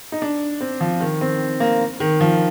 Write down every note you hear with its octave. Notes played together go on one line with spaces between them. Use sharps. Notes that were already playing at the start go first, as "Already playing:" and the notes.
D#4
D4
C4
F3
D#3
C4
A#3
D#3
F3